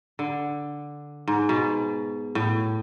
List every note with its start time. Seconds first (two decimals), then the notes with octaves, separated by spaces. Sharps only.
0.19 D3
1.28 G#2
1.49 B2
2.35 A2